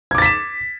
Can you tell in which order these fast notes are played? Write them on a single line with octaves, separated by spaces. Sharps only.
G#6 D6 A6 B6 E7